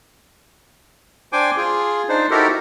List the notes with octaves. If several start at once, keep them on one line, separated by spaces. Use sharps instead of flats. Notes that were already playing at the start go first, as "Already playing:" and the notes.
D4 C5 G5 G#5 D6
F4 G#4
D4 D#4 C5
D#4 E4 F#4 G4 A4 A#4